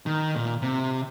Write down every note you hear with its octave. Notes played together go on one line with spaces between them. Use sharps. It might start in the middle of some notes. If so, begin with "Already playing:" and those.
D#3
A#2
C3